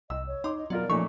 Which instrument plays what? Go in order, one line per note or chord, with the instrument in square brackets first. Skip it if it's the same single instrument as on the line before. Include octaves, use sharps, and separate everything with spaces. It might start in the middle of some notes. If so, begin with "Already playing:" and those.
[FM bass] C2 [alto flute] D#5 [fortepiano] E6
[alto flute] C#5
[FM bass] D#4 [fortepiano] C6 D6
[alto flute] D#5
[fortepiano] B2 F4 A#4 [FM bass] F#3 [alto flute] D5
[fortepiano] A#2 A3 D#4 [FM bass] F3 [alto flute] C#4 [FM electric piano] C#6